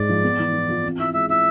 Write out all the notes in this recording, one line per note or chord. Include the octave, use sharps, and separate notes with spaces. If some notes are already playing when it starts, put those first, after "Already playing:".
Already playing: G#2 G#3 D5
F3
B3
E3
E3
F4
C4
E4 E5
G#3 E5
E4 E5